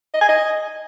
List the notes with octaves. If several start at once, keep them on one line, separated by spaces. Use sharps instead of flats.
D#5
G#5
D#5